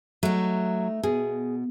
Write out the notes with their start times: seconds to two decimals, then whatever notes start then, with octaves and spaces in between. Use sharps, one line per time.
0.23 F#3 A3 D#4
1.03 B2 G#4